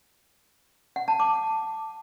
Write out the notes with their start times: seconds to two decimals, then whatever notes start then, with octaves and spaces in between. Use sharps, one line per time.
0.96 F#5
1.08 A5
1.20 D6